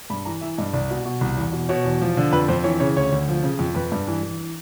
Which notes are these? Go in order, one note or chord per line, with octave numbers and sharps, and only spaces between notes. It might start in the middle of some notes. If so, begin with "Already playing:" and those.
G2 B5
E3 A#5
E3 E5
G2 D#5
C2 D5
B2
B2
C2
E2
B2
B2 C#5
E2
F3
D3
F2 B4
F2 C5
E3 C#5
C#3 C#5
D2 C#5
D2
F3
C#3
F2
F2 B4
G2
E3
E3